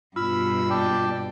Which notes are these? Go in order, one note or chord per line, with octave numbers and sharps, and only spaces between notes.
G2 B2 F4 B5 E6
D5 G5 A5